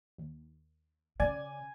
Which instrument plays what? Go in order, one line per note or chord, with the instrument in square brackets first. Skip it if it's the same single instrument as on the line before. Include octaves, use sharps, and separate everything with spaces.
[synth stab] D#2
[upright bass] C#3 [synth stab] D5 [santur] G#5